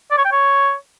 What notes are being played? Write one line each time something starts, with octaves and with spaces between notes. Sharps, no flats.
D5
C#5
G5
C#5